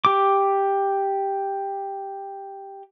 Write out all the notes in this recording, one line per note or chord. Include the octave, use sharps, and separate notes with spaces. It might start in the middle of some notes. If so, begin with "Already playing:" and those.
G4 D6